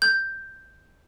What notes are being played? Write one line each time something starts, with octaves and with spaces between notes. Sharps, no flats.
G6